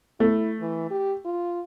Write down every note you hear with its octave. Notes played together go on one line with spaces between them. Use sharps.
A3 E4
E3
G4
F4